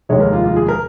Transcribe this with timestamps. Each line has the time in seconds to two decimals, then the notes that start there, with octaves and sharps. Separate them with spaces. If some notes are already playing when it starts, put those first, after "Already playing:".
0.09 F1 D#2 D#3 G#3 C#5
0.20 A#4
0.33 F4
0.44 F4
0.56 G#4
0.68 A#4